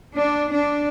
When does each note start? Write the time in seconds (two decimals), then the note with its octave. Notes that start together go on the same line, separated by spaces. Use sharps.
0.15 D4
0.52 D4